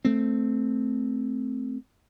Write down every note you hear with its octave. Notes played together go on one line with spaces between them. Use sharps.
A3 C4